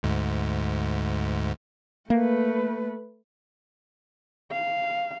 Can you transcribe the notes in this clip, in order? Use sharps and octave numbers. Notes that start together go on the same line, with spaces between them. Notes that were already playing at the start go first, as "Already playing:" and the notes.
D2 G#2
A3 A#3 B4
F5